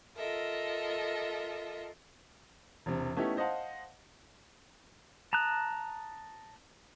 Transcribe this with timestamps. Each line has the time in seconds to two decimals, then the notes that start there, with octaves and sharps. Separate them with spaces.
0.17 F4 A4 A#4 D#5 E5
2.86 E1 C3
3.17 A3 B3 C#4 D#4 E4 G4
3.37 C5 D#5 F5 F#5 A5
5.33 A5 A#5 D#6 F#6